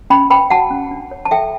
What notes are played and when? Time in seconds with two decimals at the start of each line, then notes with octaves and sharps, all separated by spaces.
0.10 C#4 G5 B5
0.30 B4 G5 B5
0.50 F#4 F#5 A5
0.70 C#4
0.91 D4
1.11 C#5
1.25 A5
1.31 A4 E5 G5